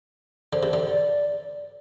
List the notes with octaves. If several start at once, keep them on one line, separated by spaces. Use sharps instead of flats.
D3 C5
C3
D3 D5